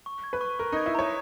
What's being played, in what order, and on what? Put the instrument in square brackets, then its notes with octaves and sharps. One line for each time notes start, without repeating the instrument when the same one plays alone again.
[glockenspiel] C#6
G#6
[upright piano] B4
[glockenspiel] C#6
[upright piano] A#4 [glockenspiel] C#6
[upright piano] D#4 [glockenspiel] G#6
[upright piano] E4
[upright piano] C#5 [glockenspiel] A#5